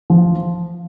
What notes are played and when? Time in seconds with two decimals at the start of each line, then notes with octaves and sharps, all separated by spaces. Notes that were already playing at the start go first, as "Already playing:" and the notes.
0.10 F3